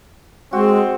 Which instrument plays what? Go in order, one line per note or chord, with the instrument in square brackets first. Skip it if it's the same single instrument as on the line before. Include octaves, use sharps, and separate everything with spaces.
[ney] G#3 [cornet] C4 [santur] F#4